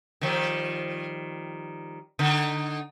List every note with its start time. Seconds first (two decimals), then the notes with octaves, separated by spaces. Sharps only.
0.21 D#3 F3 G3
2.19 D3 D#4